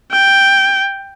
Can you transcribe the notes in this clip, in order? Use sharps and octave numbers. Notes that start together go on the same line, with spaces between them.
G5